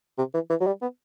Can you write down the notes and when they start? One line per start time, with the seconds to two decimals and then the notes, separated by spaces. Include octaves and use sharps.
0.18 C3
0.34 E3
0.50 E3
0.60 F#3
0.67 G3
0.82 B3